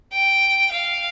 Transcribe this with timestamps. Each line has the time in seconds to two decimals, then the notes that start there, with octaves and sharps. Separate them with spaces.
0.13 G5
0.72 F5